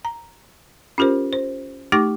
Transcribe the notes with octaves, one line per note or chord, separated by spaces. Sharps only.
A#5
C#4 F4 G4 A#4 C5
C5
A3 D#4 G4 C#6 D6 A#6